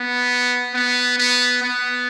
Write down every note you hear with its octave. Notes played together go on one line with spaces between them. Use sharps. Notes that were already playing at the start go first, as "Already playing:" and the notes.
Already playing: B3
B3
B3
B3